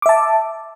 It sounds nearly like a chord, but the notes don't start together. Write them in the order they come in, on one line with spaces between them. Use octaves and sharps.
D6 E5 A5